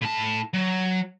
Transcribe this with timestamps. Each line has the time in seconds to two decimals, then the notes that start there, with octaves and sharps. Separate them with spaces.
0.02 A2 A5
0.54 F#3